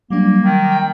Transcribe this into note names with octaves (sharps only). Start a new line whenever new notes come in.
F#3 G3 A#3 D4
D#3
G5